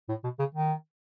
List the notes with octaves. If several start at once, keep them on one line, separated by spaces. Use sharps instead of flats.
A2
B2
C#3
D#3